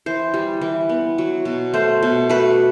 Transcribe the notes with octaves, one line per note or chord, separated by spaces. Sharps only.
E3 C5
G3
E3
B3
F#3
B2
A3 C5
B2
A3 B4